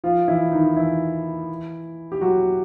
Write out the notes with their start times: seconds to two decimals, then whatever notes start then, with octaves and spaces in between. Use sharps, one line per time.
0.04 F3 F4
0.28 E3 E4
0.52 D#3 D#4
0.76 E3 E4
2.12 G4
2.21 F#3 F#4